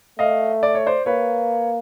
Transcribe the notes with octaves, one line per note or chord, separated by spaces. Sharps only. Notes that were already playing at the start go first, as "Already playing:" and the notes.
A3 D#5 F5
D5
C#5
C5 D5
A#3 B4 C#5